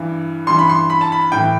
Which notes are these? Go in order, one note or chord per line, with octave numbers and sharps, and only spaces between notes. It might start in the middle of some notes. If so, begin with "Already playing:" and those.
Already playing: G2 E3
G2 E3 C6
B5
C6
B5
A5
B5
A2 E3 G5